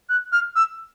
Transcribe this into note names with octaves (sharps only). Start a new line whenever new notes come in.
F#6
F6
E6